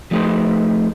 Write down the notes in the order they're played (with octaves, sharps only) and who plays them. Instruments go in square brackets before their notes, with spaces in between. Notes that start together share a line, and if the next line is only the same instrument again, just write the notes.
[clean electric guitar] F3 A3 D#4 G#4 B4 C5